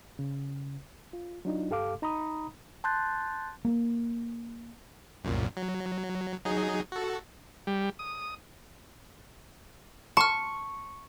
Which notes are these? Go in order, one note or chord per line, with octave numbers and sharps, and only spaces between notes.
C#3
F4
F#3 D4 D#4 F4
G2 G4 A4 F5 D6
D#4 A#5 B5 D#6
A5 C6 F#6 G6 A6
A#3
C2 F#2 A#2
F#3
F#3 D#4 G#4
F#4 A4
G3
D#6
A5 C#6 F6